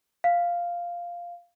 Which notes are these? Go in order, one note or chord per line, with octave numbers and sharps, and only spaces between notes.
F5